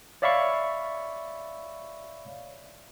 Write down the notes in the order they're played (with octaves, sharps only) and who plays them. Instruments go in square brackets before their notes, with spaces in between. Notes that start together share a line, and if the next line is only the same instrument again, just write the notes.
[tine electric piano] C#5 D5 E5 F5 B5 C#6